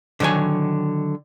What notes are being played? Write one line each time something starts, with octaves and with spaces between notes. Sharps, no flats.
D3 D#3 F#3 C#5 G#5